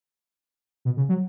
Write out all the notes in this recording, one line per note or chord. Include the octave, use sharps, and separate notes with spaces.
B2
C#3
F#3